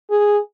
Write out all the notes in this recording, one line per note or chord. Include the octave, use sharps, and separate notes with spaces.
G#4